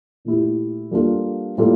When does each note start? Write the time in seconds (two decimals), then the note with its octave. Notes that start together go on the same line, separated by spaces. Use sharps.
0.25 A#2 A3 E4 G4
0.91 G3 A#3 D4 F4 A4
1.58 A2 G3 A#3 F4 A4